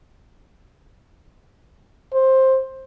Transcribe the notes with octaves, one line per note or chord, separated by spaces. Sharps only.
C5